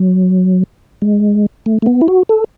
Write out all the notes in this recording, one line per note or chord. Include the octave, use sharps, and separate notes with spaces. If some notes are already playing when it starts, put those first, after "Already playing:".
Already playing: F#3
G#3
A3
A3
B3
E4
F#4
A4